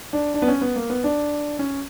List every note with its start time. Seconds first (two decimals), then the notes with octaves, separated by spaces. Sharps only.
0.13 D4
0.34 D4
0.42 B3
0.48 C#4
0.61 B3
0.76 A#3
0.90 B3
1.04 D4
1.59 C#4